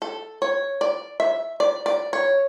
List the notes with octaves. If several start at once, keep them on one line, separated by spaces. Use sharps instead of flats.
A4
C#5
D5
E5
D5
D5
C#5